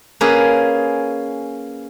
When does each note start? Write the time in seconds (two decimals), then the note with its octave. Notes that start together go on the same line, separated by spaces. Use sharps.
0.21 A#3 C#4 G#4 B4